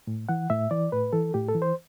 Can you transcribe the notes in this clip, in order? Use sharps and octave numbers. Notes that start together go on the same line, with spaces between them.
A2
E3 F#5
A2 E5
E3 D5
A2 B4
E3 A4
A2 G4
A4
E3
C5